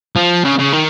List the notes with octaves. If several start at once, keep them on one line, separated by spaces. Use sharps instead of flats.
F3
C#3
C#3
D#3